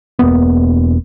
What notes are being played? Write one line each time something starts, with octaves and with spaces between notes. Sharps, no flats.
E1 A#3 B3